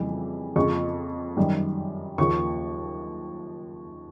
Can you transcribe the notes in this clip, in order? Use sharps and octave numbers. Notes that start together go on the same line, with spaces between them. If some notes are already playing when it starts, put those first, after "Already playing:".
Already playing: F2 C#3 E3 G3
F2 C#3 F3 C#6
F#2 D#3 G3
D#2 C#3 F3 C#6